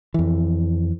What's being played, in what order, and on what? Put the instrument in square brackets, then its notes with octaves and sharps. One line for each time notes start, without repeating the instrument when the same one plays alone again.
[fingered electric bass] F2 E3